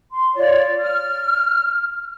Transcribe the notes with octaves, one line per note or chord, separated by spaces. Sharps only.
C6
F4 C#5 D5
F6